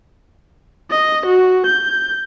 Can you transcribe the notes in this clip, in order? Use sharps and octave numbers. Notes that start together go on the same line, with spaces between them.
D#5
F#4
G6